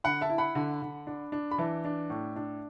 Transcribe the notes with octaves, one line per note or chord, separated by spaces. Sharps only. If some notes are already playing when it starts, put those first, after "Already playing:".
D3 F#5 B5
E5 A5
E4
F#5 B5
D3
D3
D4
D4
B5
E3 E5 A5
D4
A2
D4